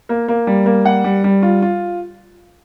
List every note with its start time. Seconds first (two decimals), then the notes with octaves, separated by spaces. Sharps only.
0.09 A#3
0.28 A#3
0.47 G3
0.66 A#3
0.85 G3 F#5
1.04 G3
1.24 G3
1.42 F4
1.62 F4